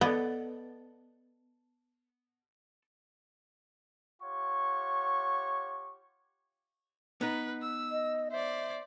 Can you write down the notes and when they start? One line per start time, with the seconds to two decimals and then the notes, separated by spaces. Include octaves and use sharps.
0.01 B3 A4 D5 D#5
4.22 F4 G4 C#5 F#5 C#6
7.21 B3 D#4 B4
7.62 E6
7.91 D#5
8.31 C5 D5 E5